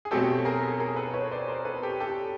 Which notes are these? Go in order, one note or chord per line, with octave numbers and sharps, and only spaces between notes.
G#4
B2 F#3 A3 C4 G4 A4
G#4 A#4
A4
G#4 A#4
A4 B4
B4 C#5
C5 D5
A#4 C5
A4 B4
G4 A4
G4 A4